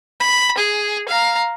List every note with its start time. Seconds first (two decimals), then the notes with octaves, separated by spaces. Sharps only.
0.20 B5
0.58 G#4
1.08 F5 A#5